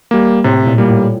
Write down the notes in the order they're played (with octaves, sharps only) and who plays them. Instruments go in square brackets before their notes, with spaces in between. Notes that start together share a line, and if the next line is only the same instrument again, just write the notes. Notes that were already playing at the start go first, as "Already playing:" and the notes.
[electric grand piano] G3 A#3
[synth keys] A2 [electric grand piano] C3
[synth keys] A#2
[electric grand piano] G3 A#3
[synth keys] A2